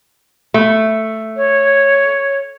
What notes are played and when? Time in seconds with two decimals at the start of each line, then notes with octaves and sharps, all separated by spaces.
0.54 A3
1.36 C#5